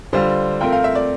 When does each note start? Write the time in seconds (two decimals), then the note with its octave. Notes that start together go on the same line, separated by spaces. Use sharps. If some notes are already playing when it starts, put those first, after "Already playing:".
0.13 D3 G3 D4 F4 C5
0.60 A3 C4 F4 A#4 G5
0.72 F5
0.84 E5
0.95 D5